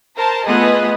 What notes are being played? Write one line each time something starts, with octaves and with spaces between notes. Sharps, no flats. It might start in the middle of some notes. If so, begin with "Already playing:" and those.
A#4 C5 A5
A3 B3 F4 G#4 B4 D#5